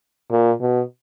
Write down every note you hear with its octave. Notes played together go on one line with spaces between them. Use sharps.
A#2
B2